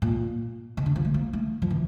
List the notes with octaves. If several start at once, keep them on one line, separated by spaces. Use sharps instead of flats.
A#2
C3
D3
F3
A3
A#3
A3
F3
E3